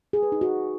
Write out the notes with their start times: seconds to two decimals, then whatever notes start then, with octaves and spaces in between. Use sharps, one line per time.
0.13 G#4
0.23 B4
0.32 D#4
0.41 F#4